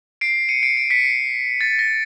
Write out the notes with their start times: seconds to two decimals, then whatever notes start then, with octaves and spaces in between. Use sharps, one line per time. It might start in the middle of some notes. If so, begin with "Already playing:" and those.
0.21 C7 D7
0.49 C#7 D#7
0.63 C7 D7
0.77 C7 D7
0.90 B6 C#7
1.04 C7
1.61 A6
1.79 A#6